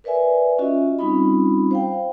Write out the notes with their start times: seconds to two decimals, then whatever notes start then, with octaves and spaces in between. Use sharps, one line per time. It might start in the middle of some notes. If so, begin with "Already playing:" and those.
0.04 A#4 B4 D5 E5 G#5
0.58 C#4 F4 F#4 D#5 E5
0.99 G3 C4 C#4 D#4 F4 B5
1.71 C5 F5 G5